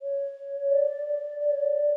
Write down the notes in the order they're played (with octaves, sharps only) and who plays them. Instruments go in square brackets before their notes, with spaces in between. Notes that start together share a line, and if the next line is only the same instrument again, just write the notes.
[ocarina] C#5
D5
D5
C#5
D5